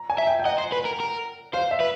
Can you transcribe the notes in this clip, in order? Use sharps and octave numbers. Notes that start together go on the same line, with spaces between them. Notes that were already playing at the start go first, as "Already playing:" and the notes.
Already playing: A#5
G#5
E5
G5
G5
D#5 F#5
C5
B4
A#4
A#4
C5 F5
E5
B4